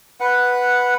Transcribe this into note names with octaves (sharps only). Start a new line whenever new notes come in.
B4 F#5